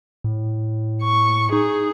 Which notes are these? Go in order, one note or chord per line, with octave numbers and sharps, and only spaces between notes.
A2
C#6
D#4 G#4